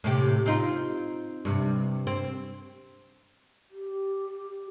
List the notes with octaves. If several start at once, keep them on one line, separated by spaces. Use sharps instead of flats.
A2 C3 G4
C4 D#4 F4
G2 C3
C4
G4